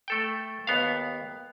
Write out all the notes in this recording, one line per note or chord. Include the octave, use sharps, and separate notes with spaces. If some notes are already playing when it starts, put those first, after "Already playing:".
A3 A4 G5
D#2 B3 F5